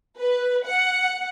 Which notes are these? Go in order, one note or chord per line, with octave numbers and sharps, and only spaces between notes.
B4
F#5